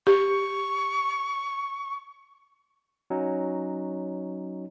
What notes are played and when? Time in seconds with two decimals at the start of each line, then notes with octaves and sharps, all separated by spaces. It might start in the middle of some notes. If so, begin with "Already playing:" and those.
0.07 G4 C#6
3.10 F#3 C#4 D#4